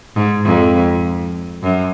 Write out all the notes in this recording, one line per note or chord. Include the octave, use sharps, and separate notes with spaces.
G#2
F2
F#2